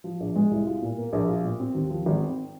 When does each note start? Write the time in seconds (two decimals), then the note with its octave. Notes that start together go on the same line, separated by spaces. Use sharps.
0.04 F3
0.20 A#1
0.36 G#3
0.51 C2
0.67 F4
0.82 A#2
0.97 A#3
1.13 A#1
1.29 F4
1.44 A#2
1.60 C4
1.75 D#2
1.90 F3
2.06 G#1
2.21 C4